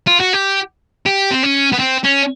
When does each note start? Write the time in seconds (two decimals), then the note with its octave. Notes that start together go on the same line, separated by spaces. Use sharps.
0.07 F4
0.20 F#4
0.33 G4
1.06 G4
1.32 C4
1.44 C#4
1.73 B3
1.80 C4
2.04 C#4